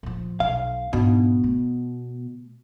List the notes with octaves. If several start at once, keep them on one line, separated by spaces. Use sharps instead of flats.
A#2 F3
B1 F5
G#2 B2 D4
A3